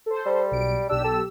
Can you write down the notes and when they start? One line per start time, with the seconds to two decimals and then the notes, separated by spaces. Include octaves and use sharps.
0.06 A4 C5
0.26 G3
0.51 B1 D7
0.89 B1 D4 G4 E6
1.04 A4